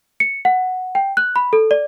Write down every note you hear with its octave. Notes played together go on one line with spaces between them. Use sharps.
C#7
F#5
G5
F#6
B5
A4
D5